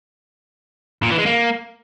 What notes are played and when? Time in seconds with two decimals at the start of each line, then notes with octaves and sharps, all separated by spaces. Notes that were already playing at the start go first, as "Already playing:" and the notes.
1.03 A#2
1.10 E3
1.18 G#3
1.26 A#3